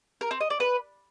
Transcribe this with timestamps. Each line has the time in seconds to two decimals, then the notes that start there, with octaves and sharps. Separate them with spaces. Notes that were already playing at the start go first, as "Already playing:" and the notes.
0.21 A#4
0.31 C4
0.41 D#5
0.50 D5
0.60 B4